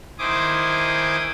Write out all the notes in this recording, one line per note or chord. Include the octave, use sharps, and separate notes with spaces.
D#3 E4 C5 G#5 D6 D#6